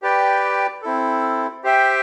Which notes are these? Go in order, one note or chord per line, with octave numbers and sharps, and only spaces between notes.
G4 B4 D5 G5
C4 E4 A4
G4 C5 E5 G5